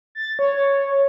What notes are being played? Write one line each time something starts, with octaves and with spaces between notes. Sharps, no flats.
A6
C#5